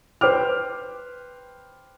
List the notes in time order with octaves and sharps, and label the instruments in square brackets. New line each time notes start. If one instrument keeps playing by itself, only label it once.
[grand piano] B4 C5 G5 D6 F6